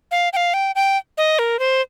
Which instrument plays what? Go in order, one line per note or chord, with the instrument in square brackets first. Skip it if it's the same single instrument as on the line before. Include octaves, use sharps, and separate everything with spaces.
[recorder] F5
G5
F5
G5
G5
D#5
A#4
C5